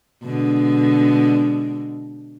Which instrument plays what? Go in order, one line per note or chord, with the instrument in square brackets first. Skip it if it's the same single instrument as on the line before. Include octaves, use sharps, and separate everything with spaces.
[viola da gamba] B2 D3 G#3